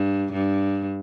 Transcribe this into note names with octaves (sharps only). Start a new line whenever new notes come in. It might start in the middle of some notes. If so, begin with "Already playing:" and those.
Already playing: G2
G2